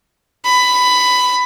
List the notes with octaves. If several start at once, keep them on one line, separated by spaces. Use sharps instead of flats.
B5